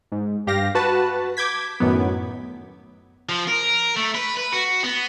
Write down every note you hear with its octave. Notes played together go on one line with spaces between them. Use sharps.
G#2
G2 G4 F5 A#6
F#4 B4 A5
D6 G6 G#6 B6
F#2 A2 D#3 F#3 B3
F3
A#4
A3
B4
B4
F#4
B3